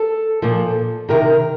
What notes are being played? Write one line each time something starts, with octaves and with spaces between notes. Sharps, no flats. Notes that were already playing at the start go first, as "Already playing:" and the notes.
Already playing: A4
A#2 F3
C3 D#3 A#4